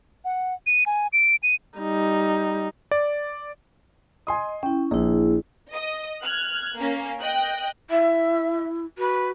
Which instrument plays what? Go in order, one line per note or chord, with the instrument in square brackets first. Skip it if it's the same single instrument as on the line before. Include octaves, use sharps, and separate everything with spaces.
[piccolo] F#5
D#7
G#5
D7
D#7
[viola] G3 D#4
[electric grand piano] D5
[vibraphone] D#5 [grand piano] G#5 C6 D#6
[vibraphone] C#4 E4 [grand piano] G5
[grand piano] A#1 [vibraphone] E4 G#4
[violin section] D#5 D#6
F6 F#6 G#6
A#3 C#4
D#5 G5 F#6
[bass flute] E4 [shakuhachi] E5
[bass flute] F#4 [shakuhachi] B4